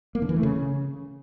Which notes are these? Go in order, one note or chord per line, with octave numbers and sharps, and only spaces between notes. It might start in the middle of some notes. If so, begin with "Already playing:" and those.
A#3
D3
E3
A3
C#3